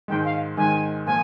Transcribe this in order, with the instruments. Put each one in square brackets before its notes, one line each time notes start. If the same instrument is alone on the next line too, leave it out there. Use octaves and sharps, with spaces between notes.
[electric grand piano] G#2 D#3 G#3 [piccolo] G5
[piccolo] F5
[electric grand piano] G#2 D#3 G#3 [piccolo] G#5
[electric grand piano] A#2 F3 [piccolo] G#5